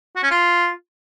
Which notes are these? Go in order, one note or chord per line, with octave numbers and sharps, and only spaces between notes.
F#4
C#4
F4